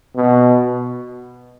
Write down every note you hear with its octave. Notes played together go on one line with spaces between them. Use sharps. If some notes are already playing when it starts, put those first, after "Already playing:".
B2